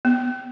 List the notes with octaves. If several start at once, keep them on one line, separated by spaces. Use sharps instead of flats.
B3